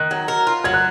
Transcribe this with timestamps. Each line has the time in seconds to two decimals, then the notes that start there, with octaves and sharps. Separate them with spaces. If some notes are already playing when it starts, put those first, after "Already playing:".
Already playing: D#3 F#6
0.11 F#3
0.28 A#4
0.47 F4
0.64 F#3 G#6
0.74 F#6